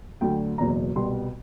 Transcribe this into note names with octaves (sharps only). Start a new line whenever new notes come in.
D2 D3 F#3 G5
F#1 E2 B2 F#3 A#5
C2 B2 G3 C6